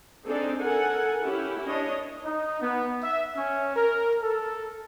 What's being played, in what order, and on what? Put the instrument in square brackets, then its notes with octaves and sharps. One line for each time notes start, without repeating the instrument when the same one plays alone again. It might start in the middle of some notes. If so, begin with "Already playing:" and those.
[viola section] C4 D4 D#4 G#4 A4 D5
A4 A#4 F#5 G#5
C#4 E4 G4
D4 C#5 D#5
[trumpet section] D#4
B3
E5
C#4
A#4
A4